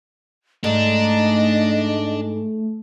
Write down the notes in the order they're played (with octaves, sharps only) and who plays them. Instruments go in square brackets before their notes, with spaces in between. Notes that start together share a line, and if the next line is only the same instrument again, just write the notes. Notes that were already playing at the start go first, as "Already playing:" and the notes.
[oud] G#2 [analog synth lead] A3 [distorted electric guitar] D4 [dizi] D#5